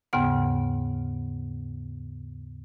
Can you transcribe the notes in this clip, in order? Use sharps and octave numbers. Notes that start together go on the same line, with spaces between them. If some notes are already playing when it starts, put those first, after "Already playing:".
D#2 G#2 C#3 B3 F#5